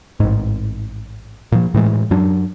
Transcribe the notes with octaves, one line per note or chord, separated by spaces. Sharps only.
A1 G#2
A#2 F3
A2 E3 G#3
F#2 F#3 D4